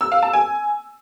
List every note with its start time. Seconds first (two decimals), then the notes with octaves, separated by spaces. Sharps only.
0.01 E6
0.12 F5
0.23 A5
0.33 G#5